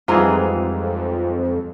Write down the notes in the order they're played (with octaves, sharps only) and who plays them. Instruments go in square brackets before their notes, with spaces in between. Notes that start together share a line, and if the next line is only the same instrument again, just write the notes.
[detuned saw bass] F2 [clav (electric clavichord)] G#2 E3 G#4 [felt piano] G3 G#3 [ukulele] F4 A#5